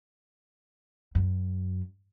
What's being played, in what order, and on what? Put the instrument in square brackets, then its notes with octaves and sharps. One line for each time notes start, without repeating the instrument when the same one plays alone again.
[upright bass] F#2